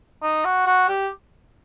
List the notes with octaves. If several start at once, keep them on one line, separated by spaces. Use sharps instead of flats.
D#4
F#4
F#4
G4